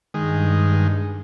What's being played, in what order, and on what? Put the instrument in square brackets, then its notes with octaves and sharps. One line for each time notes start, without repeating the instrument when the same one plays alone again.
[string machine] G2 [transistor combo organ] D#3 G#3